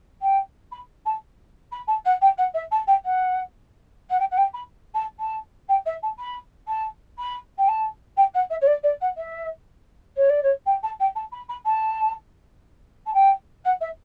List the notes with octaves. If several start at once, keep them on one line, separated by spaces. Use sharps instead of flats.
G5
B5
A5
B5
A5
F#5
G5
F#5
E5
A5
G5
F#5
F#5
G5
F#5
G5
B5
A5
A5
G5
E5
A5
B5
A5
B5
G5
A5
G5
F#5
E5
C#5
D5
D5
F#5
E5
C#5
D5
C#5
G5
A5
G5
A5
B5
B5
A5
A5
G5
F#5
E5